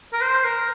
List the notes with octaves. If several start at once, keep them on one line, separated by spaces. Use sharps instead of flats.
A#4
C5
A#4